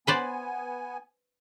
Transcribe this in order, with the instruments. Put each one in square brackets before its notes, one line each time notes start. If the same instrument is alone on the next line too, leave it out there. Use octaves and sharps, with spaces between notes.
[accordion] B3 G#5 [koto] B4 C5 D5